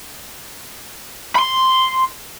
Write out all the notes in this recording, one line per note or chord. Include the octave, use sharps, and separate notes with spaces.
B5 C6